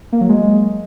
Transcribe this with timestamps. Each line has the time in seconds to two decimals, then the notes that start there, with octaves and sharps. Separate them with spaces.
0.12 A#3
0.21 F#3
0.29 G#3